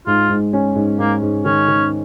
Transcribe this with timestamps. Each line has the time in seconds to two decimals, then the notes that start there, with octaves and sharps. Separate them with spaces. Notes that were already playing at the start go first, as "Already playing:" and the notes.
0.07 G#2 F4
0.30 G#2
0.53 C#4
0.75 G#2
0.99 G#2 A#3
1.22 G#2
1.45 D#3 C#4
1.68 D#3